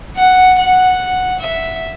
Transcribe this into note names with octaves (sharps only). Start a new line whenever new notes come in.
F#5
F#5
E5